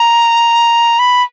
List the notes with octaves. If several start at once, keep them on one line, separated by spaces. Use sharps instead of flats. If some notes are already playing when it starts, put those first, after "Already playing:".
Already playing: A#5
B5